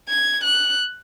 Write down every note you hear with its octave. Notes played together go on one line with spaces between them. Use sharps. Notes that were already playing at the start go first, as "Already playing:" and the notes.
G#6
F#6